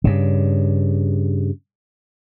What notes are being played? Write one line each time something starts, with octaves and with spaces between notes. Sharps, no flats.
G2 C#3